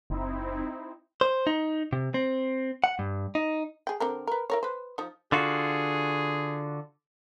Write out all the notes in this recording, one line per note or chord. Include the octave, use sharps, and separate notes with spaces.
F#1 C4 D#4 E4
C5
D#4
C3
C4
F#5
G2
D#4
G#4 G5
D3 C4 A#4
A#4 B4
E4 A#4 C#5
B4 C5
F3 D#4
D3 F4 F#4 G#4